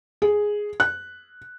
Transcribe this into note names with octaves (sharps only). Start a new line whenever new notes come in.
G#4
F#6